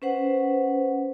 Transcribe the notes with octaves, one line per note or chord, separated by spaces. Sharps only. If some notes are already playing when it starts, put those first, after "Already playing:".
C#4 B4 C5 F#5